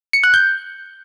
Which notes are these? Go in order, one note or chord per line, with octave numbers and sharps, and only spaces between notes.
C#7
F#6
G6